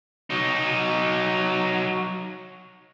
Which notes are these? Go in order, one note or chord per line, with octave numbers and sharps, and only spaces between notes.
F#3 D#4